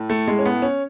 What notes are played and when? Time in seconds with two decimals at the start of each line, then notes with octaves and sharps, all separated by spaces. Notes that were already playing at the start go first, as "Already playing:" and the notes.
Already playing: A2
0.10 A3
0.27 G#3
0.39 C#4
0.45 B3
0.62 C#4